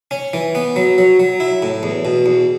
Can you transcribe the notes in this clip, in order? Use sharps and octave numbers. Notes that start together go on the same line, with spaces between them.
C#4
E3
B3
F#3
F#3
F#3
E4
A2
E2
B2
E2